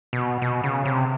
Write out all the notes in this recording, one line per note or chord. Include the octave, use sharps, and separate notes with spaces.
B2
B2
C#3
C3